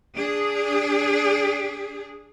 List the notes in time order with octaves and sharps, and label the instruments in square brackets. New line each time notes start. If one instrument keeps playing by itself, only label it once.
[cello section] D4 G#4